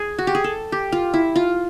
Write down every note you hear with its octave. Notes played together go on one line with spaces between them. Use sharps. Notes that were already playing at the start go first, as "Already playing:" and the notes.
Already playing: G#4
F#4
G4
G#4
A4
G4
F4
E4
F4